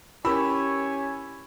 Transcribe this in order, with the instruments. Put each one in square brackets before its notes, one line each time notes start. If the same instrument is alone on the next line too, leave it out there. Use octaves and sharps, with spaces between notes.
[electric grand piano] C#4 G4 E6 [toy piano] E4 A#4 [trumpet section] C#5 G#5 [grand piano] B5